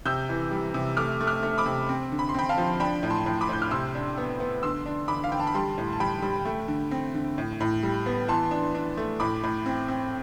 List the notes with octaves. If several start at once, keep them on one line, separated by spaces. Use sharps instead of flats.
C3 E6 G6
E3
G3
C3
A3 D6 F6
A3
D6 F6
A3
B5 D6
C3
C4
D3
B5
C6
C4 G5 B5
F5 A5
F3
D4 G5 B5
A2
A5 C6
A2
B5 D6
A2 G6
F6
C3 C6 E6
D4
B3
B3
D3 C6 E6
D4
D3 B5 D6
F5
D3 G5
A5
B5
G3 A5 C6
A2
A5
G3 G5 B5
G3
A3
D3
C4
D3
A2
A2
G3
B3
E3 A5 C6
D4
D4
A3
A2 B5 D6
A2
C4
C4